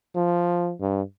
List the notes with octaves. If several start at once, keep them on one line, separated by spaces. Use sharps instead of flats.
F3
G2